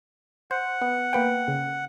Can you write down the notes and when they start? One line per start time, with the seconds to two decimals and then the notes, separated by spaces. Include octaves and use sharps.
0.51 C5 F#5
0.81 B3
1.13 A#3 B4 G5
1.48 C#3